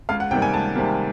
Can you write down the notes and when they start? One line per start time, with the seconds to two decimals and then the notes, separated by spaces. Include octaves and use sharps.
0.09 C#2 F5
0.20 F#5
0.31 C3 D#3 G3 A#3 G5
0.42 G#5
0.53 C#2 A5
0.76 C3 D#3 G3 A#3